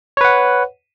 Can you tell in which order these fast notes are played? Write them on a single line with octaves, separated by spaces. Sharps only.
C#5 B4 F#5